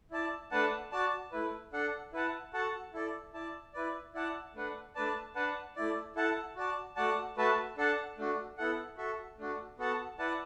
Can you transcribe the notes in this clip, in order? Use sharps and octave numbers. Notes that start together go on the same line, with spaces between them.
E4 D5 A5
A3 D4 B4 F#5 A5
F#4 D5 A5
A3 E4 B4
D4 A4 F#5
E4 B4 F#5 A5
F#4 A4 F#5 A5
E4 A4 D5
E4 D5 A5
E4 B4 D5
E4 D5 F#5 A5
A3 D4 B4 F#5
A3 D4 B4 D5 A5
D4 B4 F#5 A5
A3 E4 D5
E4 A4 F#5 A5
F#4 D5 A5
A3 F#4 D5 F#5 A5
A3 F#4 B4 E5 A5
D4 A4 F#5 A5
A3 D4 F#4
B3 E4 A4 F#5
F#4 A4 E5
A3 D4 F#4
B3 F#4 A4 F#5 A5
E4 B4 D5 F#5 A5